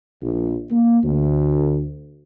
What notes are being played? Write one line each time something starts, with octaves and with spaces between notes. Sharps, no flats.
A#1
A#3
D2